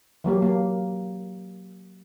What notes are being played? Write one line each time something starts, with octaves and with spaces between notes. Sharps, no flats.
E3 F#3 A#3 G4
A#3